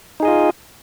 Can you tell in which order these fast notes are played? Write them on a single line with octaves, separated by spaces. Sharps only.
D#4 G#4 D#5 F4